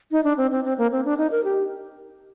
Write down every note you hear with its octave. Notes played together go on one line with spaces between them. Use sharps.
D#4
D4
C4
C4
C4
A#3
C4
D4
D#4
A#4
G4